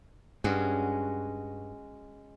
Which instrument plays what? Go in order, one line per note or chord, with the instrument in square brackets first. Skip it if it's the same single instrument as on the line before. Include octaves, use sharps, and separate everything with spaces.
[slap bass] G2 [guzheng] G#3 C#4 F#4